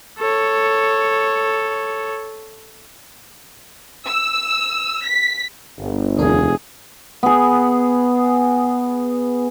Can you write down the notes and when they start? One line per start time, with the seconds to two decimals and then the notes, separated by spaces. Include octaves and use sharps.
0.20 A4 C#5
4.06 E6
5.07 B6
5.78 G1
6.18 F1 D#2 D4 G#4 A#4
7.23 B3 G#4